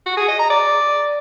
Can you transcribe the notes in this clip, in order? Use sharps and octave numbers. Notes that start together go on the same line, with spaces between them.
F#4
G#4
D#5
A#5
D5